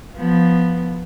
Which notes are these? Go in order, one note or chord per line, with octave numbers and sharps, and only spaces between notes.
F3 B3